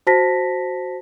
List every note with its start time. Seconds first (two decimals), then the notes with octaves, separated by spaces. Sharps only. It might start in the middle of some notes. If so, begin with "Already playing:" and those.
0.07 F#4 C5 A5 A#6 B6